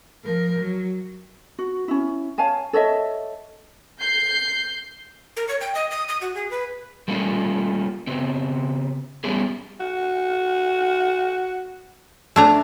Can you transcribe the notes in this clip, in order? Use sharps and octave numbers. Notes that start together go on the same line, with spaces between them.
F3 A#4
F#3
F#4
C#4 E4
C#5 F5 G#5 A5
A4 C#5 D#5 E5
G6 C7
A#4
C#5
G5
D#5
D#6
D#6
F#4
G#4
B4
G3 A3 A#3 C#4 E4 F4
C#3 B3 C4
G3 B3 C#4 E4 G4 G#4
F#4
A3 D4 A#5